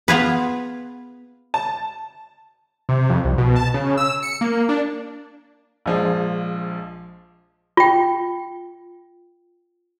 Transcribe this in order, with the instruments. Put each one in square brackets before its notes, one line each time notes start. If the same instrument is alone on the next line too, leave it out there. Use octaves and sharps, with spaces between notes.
[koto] B3 F4 G#4 B4
[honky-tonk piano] A5
[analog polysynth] C3
F2
C2
B2
A5
C#3
E6
C#7
A#3
D4
[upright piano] A#1 F3 G#3
[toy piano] F4 G5